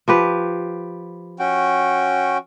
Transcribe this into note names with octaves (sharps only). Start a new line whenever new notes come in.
F3 G4 B4
C#4 F#4 G5